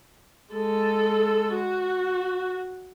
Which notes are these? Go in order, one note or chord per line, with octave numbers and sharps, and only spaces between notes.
G#3 A4
F#4